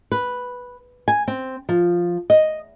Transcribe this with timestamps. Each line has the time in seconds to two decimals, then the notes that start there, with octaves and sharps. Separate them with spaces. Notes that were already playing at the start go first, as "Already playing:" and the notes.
0.12 B4
1.08 G#5
1.28 C4
1.69 F3
2.30 D#5